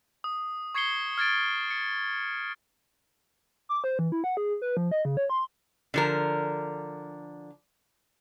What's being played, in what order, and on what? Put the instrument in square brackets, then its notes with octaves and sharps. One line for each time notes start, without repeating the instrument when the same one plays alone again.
[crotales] D#6
C#6 G#6 C7 C#7 G7
F6 G#6 A6 D7
C#7
[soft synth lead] D6
C5
E3
E4
F#5
G#4
B4
F3
D#5
C#3
C#5
C6
[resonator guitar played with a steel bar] D3 F3 A#4